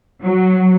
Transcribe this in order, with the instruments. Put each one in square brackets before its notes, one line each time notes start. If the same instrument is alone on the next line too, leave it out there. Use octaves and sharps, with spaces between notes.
[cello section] F#3